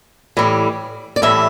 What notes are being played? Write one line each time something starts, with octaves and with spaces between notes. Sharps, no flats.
A2 E3 G3
D5
A2 E3 G3 E5